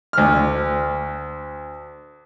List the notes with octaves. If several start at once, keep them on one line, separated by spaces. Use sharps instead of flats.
D2 F6